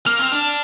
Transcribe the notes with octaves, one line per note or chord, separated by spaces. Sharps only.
A#3 F6
C4
D4